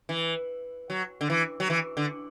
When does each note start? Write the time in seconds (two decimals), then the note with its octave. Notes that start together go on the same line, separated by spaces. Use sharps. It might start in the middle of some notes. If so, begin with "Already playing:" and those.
0.09 E3
0.90 F#3
1.21 D3
1.30 E3
1.60 F#3
1.70 E3
1.97 D3